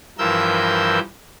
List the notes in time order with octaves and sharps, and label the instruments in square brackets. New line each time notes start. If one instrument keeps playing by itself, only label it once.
[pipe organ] G2 E3 F3 A#4 E6 G6